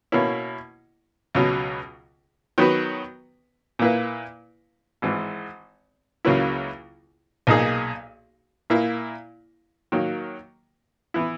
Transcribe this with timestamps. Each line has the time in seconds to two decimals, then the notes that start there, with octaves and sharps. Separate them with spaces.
0.12 B2 A#3 C#4 E4
1.35 C#2 B2 F#3
2.58 D#3 F#3 B3 F#4 B4
3.79 A#2 A#3 E4 B4
5.02 G#1 G#2 E3
6.25 C#2 C#3 F#3 A#3 E4
7.47 B1 A#2 A#3 D#4 G#4
8.70 A#2 A#3 E4
9.92 D#3 F#3 A#3
11.14 E3 B3 E4